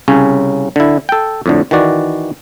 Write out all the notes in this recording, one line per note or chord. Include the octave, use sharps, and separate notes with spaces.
C2 C#3 C#4
D3 E4
A4 G5
F2 A2 D3
D#3 E3 F#4 D5